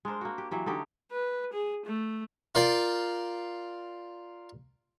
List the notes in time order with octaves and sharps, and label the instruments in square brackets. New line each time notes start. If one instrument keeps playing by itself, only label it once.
[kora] G#3 D4 A#4 C5
A#3 F#4
G4
E3 F#3 G4
D3 A3 D#4 G4
[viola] B4
G#4
A3
[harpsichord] F4 A#4 D5 F5 G5